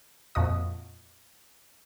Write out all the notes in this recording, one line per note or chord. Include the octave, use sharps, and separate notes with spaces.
F2 A#2 F#4 D#5 D#6